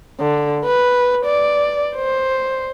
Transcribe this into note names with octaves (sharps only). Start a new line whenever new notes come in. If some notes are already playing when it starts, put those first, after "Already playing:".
D3
B4
D5
C5